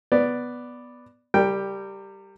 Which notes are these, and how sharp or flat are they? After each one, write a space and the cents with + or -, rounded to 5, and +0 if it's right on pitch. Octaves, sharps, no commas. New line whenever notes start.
B3 +0 D5 +0
G3 +0 A#4 -35 G5 +10